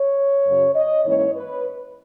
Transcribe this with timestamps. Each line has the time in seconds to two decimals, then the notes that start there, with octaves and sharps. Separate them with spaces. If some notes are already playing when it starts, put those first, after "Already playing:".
Already playing: C#5
0.46 F#2 C#3 F#3
0.74 D#5
1.03 G#2 E3 A#3 C#4 C#5
1.34 B4